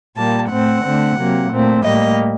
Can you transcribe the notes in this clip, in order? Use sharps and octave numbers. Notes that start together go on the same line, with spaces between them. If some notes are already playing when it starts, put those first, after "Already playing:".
A#2 G3 A#3 A5
A2 A3 C4 F#5
D3 A3 C4
C3 F#3 A#3
A#2 A3 C4
A2 G3 A#3 D#5